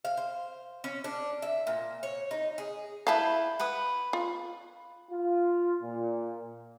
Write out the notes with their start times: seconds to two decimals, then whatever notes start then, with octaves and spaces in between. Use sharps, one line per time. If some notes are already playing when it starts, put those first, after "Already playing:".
0.05 F5
0.17 C5
0.84 C#4
1.04 D4
1.42 E5
1.67 A#2
2.03 C#5
2.31 D#4
2.58 G#4
3.07 E4 B4 F5 G5 A5
3.60 B4 F#5 D#6
4.13 F4
5.11 F4
5.82 A#2